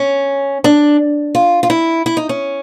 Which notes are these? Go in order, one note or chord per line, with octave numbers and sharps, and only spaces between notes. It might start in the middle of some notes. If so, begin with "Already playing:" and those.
Already playing: C#4
D4
F4
F4
E4
E4
D#4
C#4